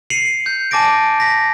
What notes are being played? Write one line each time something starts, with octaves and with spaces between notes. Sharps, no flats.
C7 C#7 D#7 F7 F#7
G6
G#5 A5 D6 A6 A#6 D7
A#6 B6